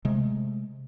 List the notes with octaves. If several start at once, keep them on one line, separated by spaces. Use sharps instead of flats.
C3 G#3 A3